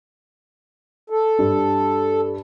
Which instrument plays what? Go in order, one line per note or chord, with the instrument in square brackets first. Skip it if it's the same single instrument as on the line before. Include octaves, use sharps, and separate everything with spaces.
[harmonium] A4
[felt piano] G2